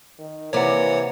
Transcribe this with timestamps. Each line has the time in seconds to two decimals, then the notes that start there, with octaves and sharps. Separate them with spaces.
0.19 D#3
0.53 C3 E3 A#3 C#5 D5 F#5